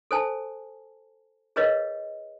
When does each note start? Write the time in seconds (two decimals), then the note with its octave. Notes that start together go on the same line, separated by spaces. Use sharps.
0.11 A4 C5 G#5 A5
1.56 G#4 A#4 B4 C#5 D#5 F5